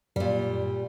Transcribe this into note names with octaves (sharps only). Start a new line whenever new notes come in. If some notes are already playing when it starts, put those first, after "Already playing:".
F#2 A#2 G3